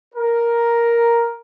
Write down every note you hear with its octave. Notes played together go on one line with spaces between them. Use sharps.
A#4